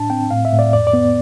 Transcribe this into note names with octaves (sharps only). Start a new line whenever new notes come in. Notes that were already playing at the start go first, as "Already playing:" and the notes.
Already playing: A2 D4 A5
C4 G5
A2 F5
E5
A2
D5
F2 D5
D5
B3